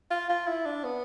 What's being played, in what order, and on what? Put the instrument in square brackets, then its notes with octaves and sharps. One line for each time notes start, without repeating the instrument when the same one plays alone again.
[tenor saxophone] F4
F4
E4
D4
B3